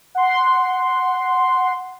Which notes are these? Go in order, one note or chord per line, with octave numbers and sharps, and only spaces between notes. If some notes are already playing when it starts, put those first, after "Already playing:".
F#5 C6